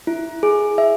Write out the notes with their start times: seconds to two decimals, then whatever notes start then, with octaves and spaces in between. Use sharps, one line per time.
0.07 E4
0.43 G#4
0.78 E5